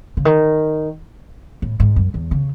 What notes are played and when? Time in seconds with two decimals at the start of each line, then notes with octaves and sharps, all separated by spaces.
0.17 C#3
0.25 D#3
1.62 A2
1.80 G#2
1.96 F#2
2.14 E2
2.31 C#3